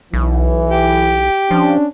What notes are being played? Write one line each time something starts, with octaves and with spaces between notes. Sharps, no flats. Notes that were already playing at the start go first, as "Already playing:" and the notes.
B1 E3
G4
F3 C#4 D4